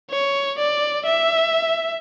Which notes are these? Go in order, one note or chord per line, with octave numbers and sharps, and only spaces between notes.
C#5
D5
E5